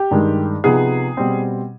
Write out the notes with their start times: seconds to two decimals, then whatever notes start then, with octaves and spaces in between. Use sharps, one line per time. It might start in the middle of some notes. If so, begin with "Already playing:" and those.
Already playing: G4
0.11 G2 D#3 G#3
0.64 C3 F3 B3 D#4 G#4
1.17 B2 G3 C4